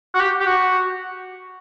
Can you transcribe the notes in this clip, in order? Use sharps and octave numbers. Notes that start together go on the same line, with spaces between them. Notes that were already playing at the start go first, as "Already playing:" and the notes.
F#4
G4
G4
F#4